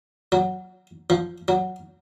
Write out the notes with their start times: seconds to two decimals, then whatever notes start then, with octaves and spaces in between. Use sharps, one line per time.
0.32 F#3
1.10 F3
1.48 F#3